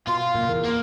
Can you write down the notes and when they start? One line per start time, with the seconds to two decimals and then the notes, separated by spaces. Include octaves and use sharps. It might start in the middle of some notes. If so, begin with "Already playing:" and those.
0.07 B2 F4 C6
0.19 F5
0.35 F#1 A#2 A#3
0.49 E2 A#4
0.65 A#3